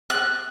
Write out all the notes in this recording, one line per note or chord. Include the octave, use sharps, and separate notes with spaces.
F#6